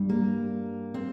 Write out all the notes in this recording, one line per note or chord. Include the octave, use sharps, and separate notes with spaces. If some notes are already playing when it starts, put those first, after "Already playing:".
Already playing: G2 G3
A#3
C4